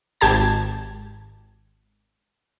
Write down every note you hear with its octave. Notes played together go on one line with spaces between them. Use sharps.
G#1 G4 A5 G#6